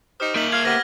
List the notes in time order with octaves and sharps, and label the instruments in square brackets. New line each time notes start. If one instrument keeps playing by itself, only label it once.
[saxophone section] D#4 G4 C5 [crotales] D#6 F6
[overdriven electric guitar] A#3 E5 [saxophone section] D#4 [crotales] G6 F#7
[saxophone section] F5 [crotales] F6 G#6
[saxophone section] B3 G4 C5 [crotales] G#6 A#6